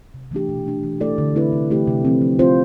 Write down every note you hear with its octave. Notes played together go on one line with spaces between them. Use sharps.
C3
E3 A3 D4 G4
B2
A3 D4
E3
A3 E4 A4 D5
D3
A3 C4 E4 B4
C3
E3 A3 E4 G4
C3
F3 C4
F3
C4 F4 C5